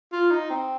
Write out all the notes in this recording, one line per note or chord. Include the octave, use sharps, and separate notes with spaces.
F4
D#4
C4